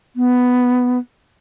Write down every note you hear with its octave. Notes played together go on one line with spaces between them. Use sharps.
B3